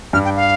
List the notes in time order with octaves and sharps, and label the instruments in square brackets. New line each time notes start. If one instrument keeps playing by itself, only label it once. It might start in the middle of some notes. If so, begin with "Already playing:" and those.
[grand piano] G2 [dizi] F6
[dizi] G5
F5